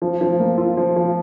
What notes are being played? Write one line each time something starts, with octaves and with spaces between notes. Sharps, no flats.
F3
F3
A#3
F4
F3
F3